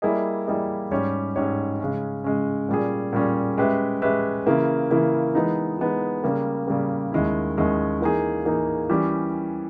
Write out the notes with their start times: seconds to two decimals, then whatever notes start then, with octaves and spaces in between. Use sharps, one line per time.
0.02 G3 A#3 E4 G#4 D#5
0.47 G3 A#3 E4 G#4 D#5
0.91 G#2 G3 C#4 G4 C#5
1.36 G#2 G3 C#4 G4 C#5
1.80 C#3 G#3 C#4
2.24 C#3 G#3 C#4
2.69 A#2 G3 C#4 G#4
3.13 A#2 G3 C#4 G#4
3.58 G#3 C#4 G4 B4 E5
4.02 G#3 C#4 G4 B4 E5
4.46 C#3 E3 A#3 E4
4.90 C#3 E3 A#3 E4
5.35 E3 G#3 B3 D#4
5.79 E3 G#3 B3 D#4
6.24 C#3 G3 A#3
6.68 C#3 G3 A#3
7.12 D#2 D#3 G#3 C#4 E4
7.57 D#2 D#3 G#3 C#4 E4
8.01 E3 A#3 D#4 G#4
8.45 E3 A#3 D#4 G#4
8.90 E3 G3 C#4 G4